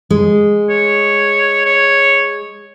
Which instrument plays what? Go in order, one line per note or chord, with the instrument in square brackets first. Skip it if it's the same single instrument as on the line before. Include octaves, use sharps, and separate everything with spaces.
[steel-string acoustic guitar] G#3
[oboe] C#5
C#5